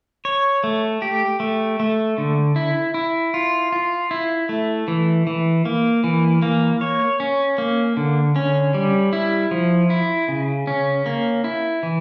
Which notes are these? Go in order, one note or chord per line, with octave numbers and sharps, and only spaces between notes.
C#5
A3
G4
A3
A3
D3
E4
E4
F4
F4
E4
A3
E3
E3
A#3
E3
A#3
C#5
C#4
A#3
D3
C#4
G3
E4
F3
E4
C#3
C#4
A#3
E4
E3